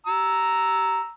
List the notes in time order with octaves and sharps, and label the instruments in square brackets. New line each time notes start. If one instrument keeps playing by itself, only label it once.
[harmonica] A#5 E6